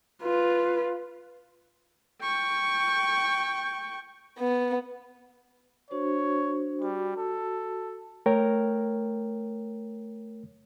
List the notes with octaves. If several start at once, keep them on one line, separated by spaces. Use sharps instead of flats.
F4 B4
G5 C#6
B3
D4 F#4 C5 C#5
G3 F#4
A4
A3 A#4 C#5 G5